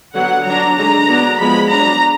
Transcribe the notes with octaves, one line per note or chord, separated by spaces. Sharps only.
D3 F#3 B3 F#5
F#3 D4 A#5
D3 G#3 D4 A#5
F#3 B3 D4
F3 G#3 B3 B5
F#3 D4 A#5